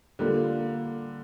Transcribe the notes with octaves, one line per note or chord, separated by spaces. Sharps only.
D3 G3 A#3 F4